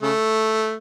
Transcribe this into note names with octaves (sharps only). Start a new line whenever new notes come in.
C#3 A3